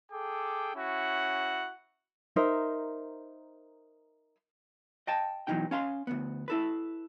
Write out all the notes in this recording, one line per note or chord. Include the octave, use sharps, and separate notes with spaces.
G#4 A4 G5 D6
C#4 E4 F#4 F#5
D#4 A#4 C5 E5
D#5 G5 A5
B2 D#3 E3 F#3 D#4 G5
C#4 F5 B5 C6
D2 A#2 B3
E4 A4 B4